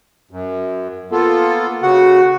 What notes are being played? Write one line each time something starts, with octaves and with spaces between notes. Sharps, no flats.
F#2
A#3 B3 F4 A4
C#3 F#4 F#5